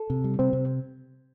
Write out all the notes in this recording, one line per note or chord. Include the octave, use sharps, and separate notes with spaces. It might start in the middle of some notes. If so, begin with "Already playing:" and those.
Already playing: A4
C3
G3
C3 C4
C3